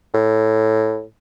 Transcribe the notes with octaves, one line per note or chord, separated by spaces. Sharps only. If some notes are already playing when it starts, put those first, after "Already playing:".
A2